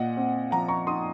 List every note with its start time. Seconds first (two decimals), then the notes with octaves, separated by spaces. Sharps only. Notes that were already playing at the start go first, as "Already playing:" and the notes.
Already playing: A#2 D#5 F#5
0.17 C4
0.51 F3 F#5 A#5
0.68 A#5 C#6
0.87 D#4 C6 D#6